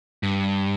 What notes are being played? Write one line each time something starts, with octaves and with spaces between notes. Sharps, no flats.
G2